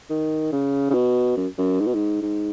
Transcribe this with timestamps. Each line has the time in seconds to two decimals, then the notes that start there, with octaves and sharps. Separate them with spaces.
0.09 D#3
0.52 C#3
0.90 C#3
0.94 B2
1.37 F#2
1.58 F#2
1.80 G#2
1.87 B2
1.94 G#2
2.22 G#2